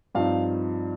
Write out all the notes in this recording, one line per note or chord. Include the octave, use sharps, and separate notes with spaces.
G2 F3 C4 D#4 F5